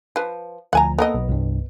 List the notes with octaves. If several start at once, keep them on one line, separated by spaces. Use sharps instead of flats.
F3 B4
D2 F3 F#5 G#5 A#5
A#3 B3 A4 A#4 D#5
B1
C2 G2